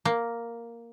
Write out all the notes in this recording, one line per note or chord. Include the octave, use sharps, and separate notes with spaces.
A#3